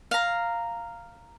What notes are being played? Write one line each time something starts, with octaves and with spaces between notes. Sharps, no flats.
F5 A#5